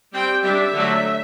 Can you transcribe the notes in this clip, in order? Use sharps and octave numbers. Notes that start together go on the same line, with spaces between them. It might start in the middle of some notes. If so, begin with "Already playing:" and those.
G3 C4 G5
G3 D4 E5
D3 F#3 A3